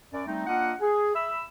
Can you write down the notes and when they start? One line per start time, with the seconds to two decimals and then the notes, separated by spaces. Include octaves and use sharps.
0.13 F#2 D5
0.27 G3 A3 C4 D#4
0.47 A#3 D4 F4 D#5 F#5
0.81 G#4
1.15 E5 B5 E6